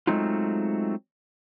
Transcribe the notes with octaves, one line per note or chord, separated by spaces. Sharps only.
F#3 G#3 A3 C4 D#4 F4